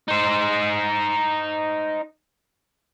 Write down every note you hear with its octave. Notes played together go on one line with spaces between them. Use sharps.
D#4 C5